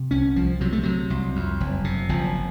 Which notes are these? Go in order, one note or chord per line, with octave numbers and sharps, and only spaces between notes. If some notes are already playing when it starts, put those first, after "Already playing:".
Already playing: C3
C2 C#4
C2 F3
C3 F#3
A3
C3 F#3
C2
F2
F#1
C3
F#1 F3